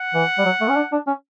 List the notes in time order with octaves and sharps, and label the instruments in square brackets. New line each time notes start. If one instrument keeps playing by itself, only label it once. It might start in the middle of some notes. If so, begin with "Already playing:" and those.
Already playing: [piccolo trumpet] F#5
[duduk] E3
G3
F#3
A3
C#4
D4
D4
C#4